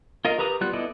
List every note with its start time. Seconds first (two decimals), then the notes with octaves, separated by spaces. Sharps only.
0.25 F4 A#4 D#5 F5
0.38 G4 A#4 B4 A#5 D#6
0.61 G3 B3 F4 F#6
0.73 B3 E4 A4 D5 D#5